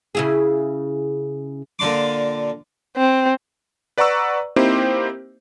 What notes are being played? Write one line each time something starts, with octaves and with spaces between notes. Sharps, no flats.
C#3 E4 G#4
A#2 D3 D4 C6 D6
C4
B4 D5 F#5 A#5 C#6 E6
A#3 C4 D#4 E4 G4 C5